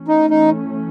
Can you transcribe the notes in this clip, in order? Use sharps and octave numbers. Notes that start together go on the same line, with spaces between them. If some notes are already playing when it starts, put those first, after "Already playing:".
Already playing: E3 A3 C#4
D#4
D#4